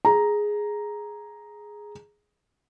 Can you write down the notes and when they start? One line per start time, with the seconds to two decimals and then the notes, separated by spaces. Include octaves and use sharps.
0.05 G#4 A#5